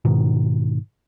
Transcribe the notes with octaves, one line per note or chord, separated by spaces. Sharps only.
G#2 B2 D#3